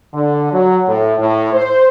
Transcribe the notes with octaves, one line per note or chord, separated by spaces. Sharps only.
D3
F#3
A2
A2
C5